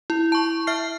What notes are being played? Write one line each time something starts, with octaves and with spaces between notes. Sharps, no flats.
E4
A5 C#6
E5 F6 C7